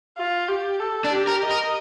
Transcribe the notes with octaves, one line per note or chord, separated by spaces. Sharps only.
F4
G4
A4
D4
G4
A#4
D#5
A#4